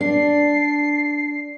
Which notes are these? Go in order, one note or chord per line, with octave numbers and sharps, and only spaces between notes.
D4 C7